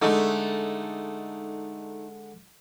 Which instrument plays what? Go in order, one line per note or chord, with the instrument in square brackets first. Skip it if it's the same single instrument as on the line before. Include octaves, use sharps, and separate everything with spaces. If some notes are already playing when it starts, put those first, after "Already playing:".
[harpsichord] D3 G#3 [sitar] A3 D#4